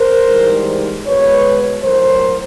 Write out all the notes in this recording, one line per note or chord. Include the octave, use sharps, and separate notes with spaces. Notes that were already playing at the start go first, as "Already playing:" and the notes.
Already playing: A#4 C5
G#2 E3 G3
B2 G#3 B4 C#5
A2 F#3 A#4 C5